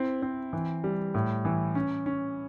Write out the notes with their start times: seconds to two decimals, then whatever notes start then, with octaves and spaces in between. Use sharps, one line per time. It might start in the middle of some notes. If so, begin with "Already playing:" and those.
Already playing: C4 E4
0.22 C4
0.53 E3
0.84 G3
1.14 A2
1.45 E3
1.75 C#4
2.06 C#4